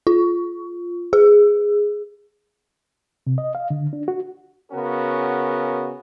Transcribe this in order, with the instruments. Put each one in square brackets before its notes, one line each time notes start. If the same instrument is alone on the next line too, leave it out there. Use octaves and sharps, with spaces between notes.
[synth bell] F4
G#4
[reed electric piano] C3
D#5
F5
D3
D4
F#4
[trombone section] C#3 B3 C#4 F#4 A#4